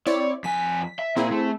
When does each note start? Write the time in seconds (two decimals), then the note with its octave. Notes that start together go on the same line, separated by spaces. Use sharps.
0.07 C4 E4 C#5 D5
0.44 F2 G#5 B6
0.99 E5
1.17 A#2 A#3 C4 E4 G#4
1.31 A3